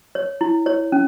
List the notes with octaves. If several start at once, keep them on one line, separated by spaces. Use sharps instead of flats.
C#5
E4
C#5
C#4